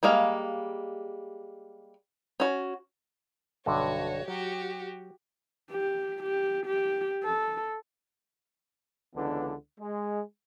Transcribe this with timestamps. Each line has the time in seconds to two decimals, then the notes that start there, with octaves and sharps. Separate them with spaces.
0.03 G3 G#3 A#3 F5
2.40 C#4 F#4
3.66 B1 G2 D3 F#4 C#5
4.28 F#3 F#4 G4
5.71 G4
6.23 G4
6.66 G4
7.24 A4
9.14 C#2 D3 E3 B3 D4
9.79 G#3